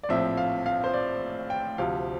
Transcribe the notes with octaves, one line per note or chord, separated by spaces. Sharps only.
D5
A#1 A2 F3 C4 E5
F5
F5
C5
D5
G5
D2 C3 F3 F5